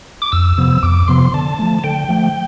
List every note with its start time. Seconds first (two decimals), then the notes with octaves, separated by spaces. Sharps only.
0.22 D6
0.32 F2 E6
0.58 C3 F3 B3
0.83 F2 D6
1.08 C3 F3 B3 C6
1.34 D3 A5
1.59 F3 A3
1.79 A5
1.84 D3 G5
2.09 F3 A3